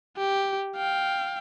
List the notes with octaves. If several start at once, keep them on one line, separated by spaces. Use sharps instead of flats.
G4
F5 G5